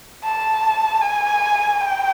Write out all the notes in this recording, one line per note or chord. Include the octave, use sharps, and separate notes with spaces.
A5
G#5
G5